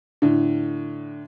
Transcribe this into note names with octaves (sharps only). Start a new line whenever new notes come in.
A2 D3